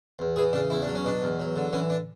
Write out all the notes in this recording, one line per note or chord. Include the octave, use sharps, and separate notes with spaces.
E2
E3 G#4
C#3 D4
E2 E4
D4
F#3
C#4
B2 D4
E2
F#3
D3
E3 C#4
D4